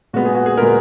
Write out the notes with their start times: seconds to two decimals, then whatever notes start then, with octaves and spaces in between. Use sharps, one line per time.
0.13 A#2 G#3 B3 F#4
0.25 G#4
0.35 F#4
0.46 G#4
0.57 A#2 G#3 B3 A#4